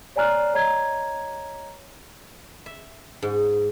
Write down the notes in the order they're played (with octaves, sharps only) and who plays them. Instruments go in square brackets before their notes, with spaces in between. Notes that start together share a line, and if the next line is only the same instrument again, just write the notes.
[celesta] C#5 D5 G#5 A#5 F6 F#6
C#5 D#5 A#5 G#6
[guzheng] E5
G#2